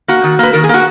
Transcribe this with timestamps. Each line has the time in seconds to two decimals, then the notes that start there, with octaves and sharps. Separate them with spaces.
0.08 A#3 F#4
0.24 D#3
0.39 A#3 B4
0.53 D#3 A#4
0.64 G#4
0.69 A#3 F#4